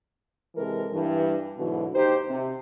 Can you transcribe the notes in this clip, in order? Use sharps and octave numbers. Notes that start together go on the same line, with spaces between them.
C3 E3 G#3 A4 A#4
G2 E3
G#2 B2 D3 E3 F#3
D#2 D#4 G4 C5
C3